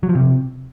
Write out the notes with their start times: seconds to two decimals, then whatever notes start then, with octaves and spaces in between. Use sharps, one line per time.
0.03 F#3
0.09 F3
0.15 C3